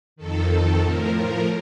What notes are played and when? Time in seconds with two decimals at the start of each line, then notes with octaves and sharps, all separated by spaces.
0.16 F2 D#3 A4
0.48 A4
0.80 A2 F3 A#4
1.12 A#4